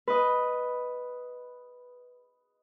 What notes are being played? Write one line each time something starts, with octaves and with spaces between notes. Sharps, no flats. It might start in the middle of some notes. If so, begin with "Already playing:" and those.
B4 D#5